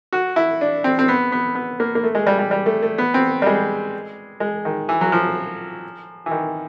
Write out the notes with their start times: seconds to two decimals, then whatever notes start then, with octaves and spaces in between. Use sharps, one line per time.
0.13 F#4
0.36 E4
0.61 D4
0.84 C4
0.99 C4
1.08 B3
1.32 B3
1.55 B3
1.80 A#3
1.95 A#3
2.03 A3
2.15 G#3
2.27 G3
2.39 G3
2.51 G3
2.66 A3
2.82 A3
2.98 B3
3.14 C4
3.42 G3
3.46 G#3
4.40 G#3
4.65 D#3
4.89 E3
5.01 F#3
5.12 F3
6.26 E3
6.31 D#3